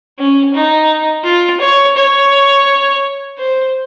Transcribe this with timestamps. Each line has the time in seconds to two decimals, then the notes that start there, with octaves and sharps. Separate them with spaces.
0.18 C#4
0.54 D#4
1.24 F4
1.60 C#5
1.96 C#5
3.38 C5